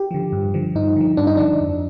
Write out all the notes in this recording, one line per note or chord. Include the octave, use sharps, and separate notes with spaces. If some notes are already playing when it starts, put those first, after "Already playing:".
Already playing: G4
D3 F3
G2
D3 F3
G2 D#4
D3 F3
G2 D4
D#4
D3 F3 D4
F2